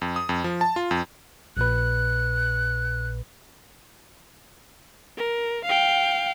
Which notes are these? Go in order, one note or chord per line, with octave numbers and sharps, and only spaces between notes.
F2
D#6
F2
F3
A5
F4
F2
A#1 A#2 B4 F#6
A#4
F5 G5